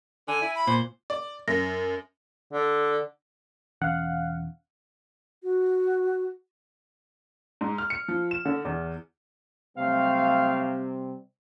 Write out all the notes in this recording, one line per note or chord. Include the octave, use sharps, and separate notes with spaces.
D3 G#5
E4
B5
A#2 C5
D5
F#2 A#6
D3
E1 E3 C#4 F5 F#5
F#4
G#2
F6
C#7
F3
E7
D3
E2
C3 F#3 G3 A3 C4 F5